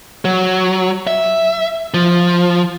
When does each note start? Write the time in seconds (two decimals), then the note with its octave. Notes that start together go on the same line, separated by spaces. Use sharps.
0.25 F#3
1.07 E5
1.94 F3